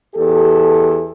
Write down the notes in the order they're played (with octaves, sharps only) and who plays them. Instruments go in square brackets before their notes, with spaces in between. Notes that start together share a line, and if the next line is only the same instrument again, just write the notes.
[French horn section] E2 G4 A4